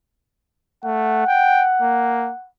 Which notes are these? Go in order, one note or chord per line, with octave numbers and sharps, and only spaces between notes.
A3 F#5
G5
A#3